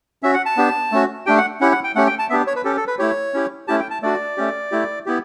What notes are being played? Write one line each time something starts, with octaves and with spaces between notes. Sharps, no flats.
C#4 F#4 E5
F#5
A5
B3 D4 G4
A3 C#4 F#4
A3 D4 G4 G5
F#5
C#4 E4 G4 F#5
F#5
G5
A3 C#4 G4 F#5
G5
A5
B3 D4 G4 E5
C#5
B4
C#4 G4 A4
A4
B4
A3 E4 G4 C#5
C#4 E4 G4
A3 C#4 E4 G4 A5
G5
A5
A3 D4 F#4 D5
A3 C#4 G4
A3 E4 G4
B3 E4 G4